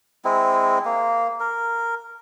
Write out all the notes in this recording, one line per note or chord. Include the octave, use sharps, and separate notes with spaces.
G#3 C4 E4
A#3
A#4